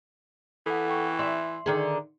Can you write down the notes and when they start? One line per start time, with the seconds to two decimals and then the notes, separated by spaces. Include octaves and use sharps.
0.66 E3 A4 F#5
0.89 G5 C#6
1.19 E5 C6
1.66 D3 D#3 G#4